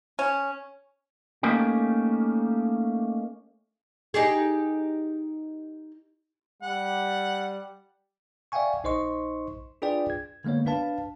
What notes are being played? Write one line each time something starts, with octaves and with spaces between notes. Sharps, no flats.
C#4
A3 A#3 C#4 D#4 G4
D#4 G4 G#4
G3 F#5
D5 E5 F5 G5 G#5 C#6
A#1 D#4 C5 D#5 C6 C#6
D4 F4 G#4 B4 D5 G5
G#6
D3 G#3 A#3 B3 C#5
D4 B4 F5 A5